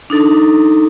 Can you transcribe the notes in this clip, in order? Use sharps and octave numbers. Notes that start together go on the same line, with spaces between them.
D4 D#4 A4